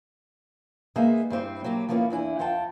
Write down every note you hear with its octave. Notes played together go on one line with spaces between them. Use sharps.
G#3 A#3 B3 D#4 G#4 E5
G2 G3 C4 E4
F#3 A#3 G4
F3 A#3 B3 C#4 E4
E2 D4 E4 G#5
F2 F4 F#5 G5 A5